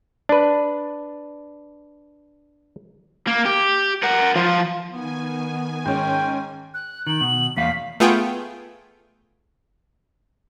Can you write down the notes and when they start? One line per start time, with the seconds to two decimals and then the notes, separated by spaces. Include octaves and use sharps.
0.29 D4 B4
3.27 A#3
3.45 G4
4.03 A#4 F#5
4.36 F3 F4
4.91 D#3 B3 G#5
5.85 G#2 C#4 G5
6.74 F#6
7.07 D#3 F#7
7.21 B2
7.57 E2 A#3 F5 B6
8.00 A3 B3 F4 G#4 G5